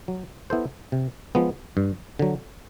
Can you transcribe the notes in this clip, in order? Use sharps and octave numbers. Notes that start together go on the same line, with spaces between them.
F#3
B3 E4 A4 C5
C3
F3 G#3 B3
G2
D3 F#3